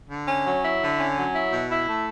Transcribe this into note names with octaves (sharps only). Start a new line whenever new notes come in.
D3
C#4
F#3
E4
D3
C#4
F#3
E4
B2
E4
A3